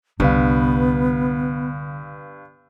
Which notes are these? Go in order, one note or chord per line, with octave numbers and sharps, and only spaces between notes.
C2 G2 D3 B3 D4 B4 F5